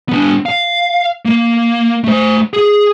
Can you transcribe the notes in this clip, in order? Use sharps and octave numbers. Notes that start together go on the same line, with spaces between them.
B3 D4
F5
A#3
A3 C5
G#4